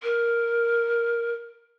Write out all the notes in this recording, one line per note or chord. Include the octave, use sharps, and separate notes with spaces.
A#4